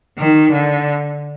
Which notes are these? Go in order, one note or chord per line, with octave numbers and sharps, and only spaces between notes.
D#3
D3